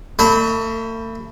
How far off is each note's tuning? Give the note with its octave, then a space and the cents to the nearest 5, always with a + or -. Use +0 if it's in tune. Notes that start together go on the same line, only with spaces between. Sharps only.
A3 +40 E5 -35 B5 +0